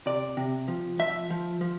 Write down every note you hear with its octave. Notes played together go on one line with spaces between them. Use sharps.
C3 D5
C3
F3
F3 E5
F3
F3